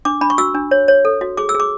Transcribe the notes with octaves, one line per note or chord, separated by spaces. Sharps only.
D4 D6
D4 B5
C#6
F#4 E6
D4
C#5
C#5
A4
F#4
G#4 D6
E6
G#4
D6